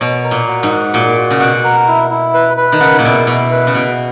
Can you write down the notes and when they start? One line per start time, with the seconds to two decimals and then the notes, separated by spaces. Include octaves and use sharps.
0.01 B2 C#5
0.24 A#4
0.31 A#2
0.48 F#4
0.63 G#2
0.70 F#5
0.94 A#2 F#4
1.17 F#4
1.31 C#3
1.40 B2 F#5
1.64 A#4
1.88 E4
2.10 E4
2.34 B4
2.57 B4
2.72 D#3
2.81 C#3 F#5
2.99 A#2
3.05 B2 E4
3.27 B2 E4
3.51 B4
3.67 C#3
3.74 B2 F#4